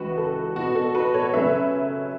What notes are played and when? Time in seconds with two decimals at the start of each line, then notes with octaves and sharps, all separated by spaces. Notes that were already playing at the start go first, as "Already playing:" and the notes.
Already playing: C#2 C#3 E3 F#4 B4
0.17 A4
0.56 B2 B3 F#4
0.75 A4
0.95 F#4 B4
1.14 A4 C#5
1.33 F#2 C#3 A3 C#4 B4 E5